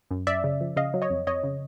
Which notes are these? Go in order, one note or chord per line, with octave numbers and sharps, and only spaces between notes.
F#2
F#2 D5 E5
C#3
F3
C#3 D#5 F5
F#3
C#5 D#5
F2
F2 C#5 D#5
C#3